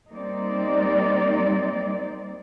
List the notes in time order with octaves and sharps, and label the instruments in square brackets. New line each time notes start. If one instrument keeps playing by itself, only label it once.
[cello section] G3 A#3 C4 D#4 D5